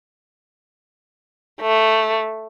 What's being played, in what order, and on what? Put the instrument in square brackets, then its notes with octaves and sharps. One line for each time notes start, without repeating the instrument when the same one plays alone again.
[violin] A3